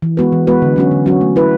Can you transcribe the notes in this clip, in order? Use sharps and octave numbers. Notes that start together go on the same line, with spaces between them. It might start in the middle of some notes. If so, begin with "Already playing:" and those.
E3
G#3 B3 F#4 B4
E3
G#3 B3 F#4 B4
D3
F#3 C#4 F#4
D3
F#3 C#4 F#4
A3
E4 B4